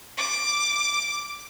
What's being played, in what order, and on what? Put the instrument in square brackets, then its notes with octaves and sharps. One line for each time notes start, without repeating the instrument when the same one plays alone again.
[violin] D6